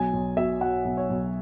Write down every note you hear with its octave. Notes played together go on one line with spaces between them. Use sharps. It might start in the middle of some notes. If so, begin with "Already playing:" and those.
Already playing: B1 G#5
B1
B2 E5
F#3 F#5
B1
C#5
B1